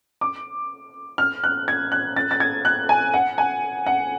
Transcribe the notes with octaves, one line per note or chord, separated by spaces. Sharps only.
D6
F6
F#6
G#6
F#6
A6
A6
G#6
F#6
G#5
F#5
G#5
F#5